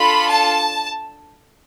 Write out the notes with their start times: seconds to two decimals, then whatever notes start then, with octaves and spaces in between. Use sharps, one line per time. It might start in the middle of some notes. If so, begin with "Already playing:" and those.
Already playing: D4 F4 A4 B5
0.30 A5